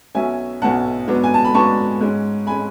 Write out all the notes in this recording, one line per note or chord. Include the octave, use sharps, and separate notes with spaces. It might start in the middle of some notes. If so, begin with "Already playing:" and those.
B1 B2 F#3 C#4 E5 G#5
B1 B2 F#3 C#4 F#5 A5
G#2 F#3 B3 D4
G#5
A5
B5
G#2 F#3 B3 D4 A5 C#6
G#2 G#3 C#4
G#5 B5
G#3 C#4